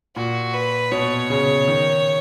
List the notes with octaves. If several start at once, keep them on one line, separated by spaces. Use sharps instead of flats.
A#2 F#4
B4
B2 C#5
C#3
D#3